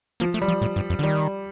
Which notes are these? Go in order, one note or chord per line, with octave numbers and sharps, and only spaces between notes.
F3 A#3
A3
G3
F3
A2
G2
F2
D3
D#3 G3